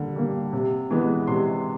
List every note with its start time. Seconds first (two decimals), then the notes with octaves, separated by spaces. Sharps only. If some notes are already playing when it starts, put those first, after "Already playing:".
Already playing: D3 G3 A#3
0.16 G3 A#3
0.53 C3
0.90 E3 G#3 B3
1.27 C3 C6